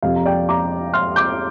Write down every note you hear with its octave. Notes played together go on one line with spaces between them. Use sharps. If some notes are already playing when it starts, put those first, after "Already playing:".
F2 C3 F3 F5
A#5
D5 G5
A#5 D6
C6 F6
D6 G6